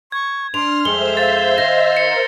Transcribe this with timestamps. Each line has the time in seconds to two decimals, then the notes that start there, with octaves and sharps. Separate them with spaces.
0.12 C#6 G#6
0.54 D4 C6 F6 F7
0.85 F2 G#3 A4 C5 E5 G7
1.17 F5 A6
1.58 D#3 D#4 A#6
1.97 A#4 C5 C#7